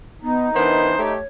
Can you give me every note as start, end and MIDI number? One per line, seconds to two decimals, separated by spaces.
0.22 0.53 59
0.22 1.13 63
0.55 0.92 52
0.55 0.92 59
0.55 0.92 62
0.55 0.90 70
0.55 1.00 72
0.97 1.16 57
0.97 1.16 67
0.97 1.26 73